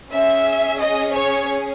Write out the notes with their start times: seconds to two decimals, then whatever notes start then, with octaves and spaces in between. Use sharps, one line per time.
0.12 C#4 G#4 E5
0.80 D#5
1.15 C#5